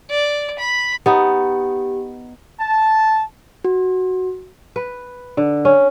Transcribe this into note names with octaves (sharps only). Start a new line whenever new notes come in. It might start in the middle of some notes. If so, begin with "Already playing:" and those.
D5
B5
B3 D#4 G4
A5
F#4
B4
D3
C#4